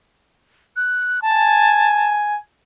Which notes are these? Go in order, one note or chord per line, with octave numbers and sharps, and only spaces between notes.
F#6
G#5 A5